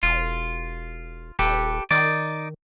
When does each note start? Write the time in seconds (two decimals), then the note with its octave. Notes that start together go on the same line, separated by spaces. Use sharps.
0.03 E1 F4
1.39 D#1 G4 A4 B4
1.91 D#3 D#4 D5